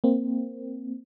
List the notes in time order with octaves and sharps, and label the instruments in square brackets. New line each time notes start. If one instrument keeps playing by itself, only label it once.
[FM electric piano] A#3 C4